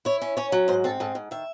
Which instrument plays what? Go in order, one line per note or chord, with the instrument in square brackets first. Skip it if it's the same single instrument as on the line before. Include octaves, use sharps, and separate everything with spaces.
[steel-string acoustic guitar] E4 C#5
C#4
C#4 C#5
F#3
G#2 C5
C4 A4
G#2 A4
G#2
D#3 E5